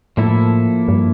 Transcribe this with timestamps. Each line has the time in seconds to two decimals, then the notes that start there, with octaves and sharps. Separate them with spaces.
0.17 A2 F3 A#3 E4 A4
0.88 G2